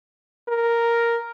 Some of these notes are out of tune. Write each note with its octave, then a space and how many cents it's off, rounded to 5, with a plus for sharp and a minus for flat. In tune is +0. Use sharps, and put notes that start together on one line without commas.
A#4 +0